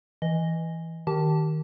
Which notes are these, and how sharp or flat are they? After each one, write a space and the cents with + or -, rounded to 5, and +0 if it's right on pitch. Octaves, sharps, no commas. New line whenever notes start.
E3 +0 D#5 +0
D#3 +0 G4 -20 A5 +0